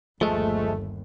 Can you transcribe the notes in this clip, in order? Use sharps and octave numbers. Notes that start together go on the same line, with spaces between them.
G1 D#2 F3 G#3 A3